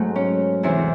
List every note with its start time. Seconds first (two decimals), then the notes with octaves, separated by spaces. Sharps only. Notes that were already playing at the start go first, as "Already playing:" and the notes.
Already playing: G#2 F#3 A3
0.16 C#4
0.63 E2 C3 E3 E4